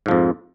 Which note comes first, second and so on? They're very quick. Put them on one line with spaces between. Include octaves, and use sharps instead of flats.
G#2 F3 F2